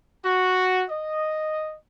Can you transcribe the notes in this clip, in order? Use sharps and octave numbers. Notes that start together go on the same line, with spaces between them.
F#4
D#5